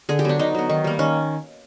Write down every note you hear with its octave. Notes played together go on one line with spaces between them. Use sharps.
D3 G#4
G4
F#3 B3 D4
D3 D#4
F#3 B3
D#3
G3 A#3
D#3 C#4